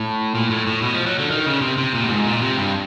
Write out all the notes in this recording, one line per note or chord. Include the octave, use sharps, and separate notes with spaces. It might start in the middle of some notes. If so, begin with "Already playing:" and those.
Already playing: A2
A#2
A2
A2
B2
F3
F#3
D3
D#3
C#3
C3
C3
A#2
A2
G#2
A#2
C3
G2